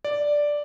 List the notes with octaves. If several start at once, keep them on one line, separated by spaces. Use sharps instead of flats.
D5